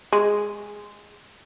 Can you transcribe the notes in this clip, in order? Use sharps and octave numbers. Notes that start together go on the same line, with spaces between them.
G#3